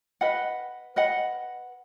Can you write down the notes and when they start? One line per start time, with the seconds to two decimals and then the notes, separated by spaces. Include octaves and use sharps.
0.21 B4 D#5 F#5
0.96 B4 D#5 F#5